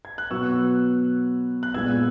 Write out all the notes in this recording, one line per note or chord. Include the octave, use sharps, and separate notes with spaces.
G#6
F#6
B2 F#3 B3 C#6 E6
F#6
A#2 G#3 B3 E6 G#6